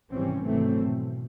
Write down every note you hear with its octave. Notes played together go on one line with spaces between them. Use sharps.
G#1 C3 E3 G3 C4 C#4
G#1 C3 E3 F#3 A3 C4
B2